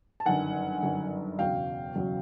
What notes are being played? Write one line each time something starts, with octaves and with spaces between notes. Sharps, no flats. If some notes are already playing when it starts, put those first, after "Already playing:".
A5
G1 F#2 D#3 F#5 G#5
G1 F#2 D#3
F#1 E2 B2 F#3 F5 G5
F#1 E2 B2 F#3